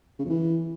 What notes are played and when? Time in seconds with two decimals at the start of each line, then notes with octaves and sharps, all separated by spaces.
0.19 C#3
0.24 F2
0.30 E3